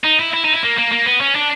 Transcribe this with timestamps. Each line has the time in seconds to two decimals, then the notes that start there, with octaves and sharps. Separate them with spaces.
0.04 D#4
0.19 E4
0.34 E4
0.44 D#4
0.53 E4
0.63 A#3
0.77 A#3
0.92 A#3
1.06 B3
1.21 C#4
1.35 D4